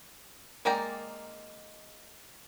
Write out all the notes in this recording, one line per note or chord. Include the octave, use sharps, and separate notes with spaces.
G#3 A#3 D5 G5 A#5